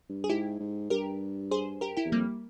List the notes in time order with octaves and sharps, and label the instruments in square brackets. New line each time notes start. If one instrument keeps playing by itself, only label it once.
[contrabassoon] G2
[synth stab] G#4
[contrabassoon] G#2 [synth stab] E4 G4
[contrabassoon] G#2
[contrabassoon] G2 [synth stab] G4 A#4
[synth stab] G#4 C5
G4 A#4
E4 G4
[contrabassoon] E2
[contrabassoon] F2 [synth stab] G3 A#3